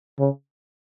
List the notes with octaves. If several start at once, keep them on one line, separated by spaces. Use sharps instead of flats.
C#3